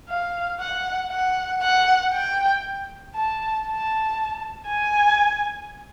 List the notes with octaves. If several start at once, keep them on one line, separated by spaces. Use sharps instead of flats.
F5
F#5
F#5
F#5
G5
A5
A5
G#5